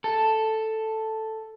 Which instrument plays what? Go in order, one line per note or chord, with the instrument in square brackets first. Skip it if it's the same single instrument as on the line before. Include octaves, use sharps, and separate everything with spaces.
[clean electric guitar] A4